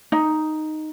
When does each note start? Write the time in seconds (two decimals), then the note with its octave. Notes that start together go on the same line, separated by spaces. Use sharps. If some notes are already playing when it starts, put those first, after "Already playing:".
0.12 D#4